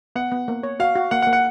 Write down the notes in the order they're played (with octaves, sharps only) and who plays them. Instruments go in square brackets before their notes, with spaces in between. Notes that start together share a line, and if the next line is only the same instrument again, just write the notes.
[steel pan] B3 [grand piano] F#5
[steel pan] B3
A#3
C#5
[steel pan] F#4 [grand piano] F5
[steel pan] F#4
[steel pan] A#3 [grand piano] F#5
[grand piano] F#5
[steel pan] A#3
[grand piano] F#5